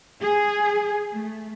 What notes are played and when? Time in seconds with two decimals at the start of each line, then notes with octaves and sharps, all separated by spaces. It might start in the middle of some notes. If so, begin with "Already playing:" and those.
0.21 G#4
1.13 A3